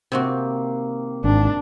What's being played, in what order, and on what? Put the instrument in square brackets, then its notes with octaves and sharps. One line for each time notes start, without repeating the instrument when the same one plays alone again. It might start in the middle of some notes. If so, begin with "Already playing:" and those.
[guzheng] C3 C4 F#4 [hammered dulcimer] D#3 A#3
[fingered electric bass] G#1 [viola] D4